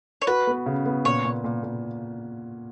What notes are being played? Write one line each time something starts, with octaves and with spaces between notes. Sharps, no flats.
C#5
F#4 B4
B3
C#3
B3
A#2 C#5
A#2
A#2
A#2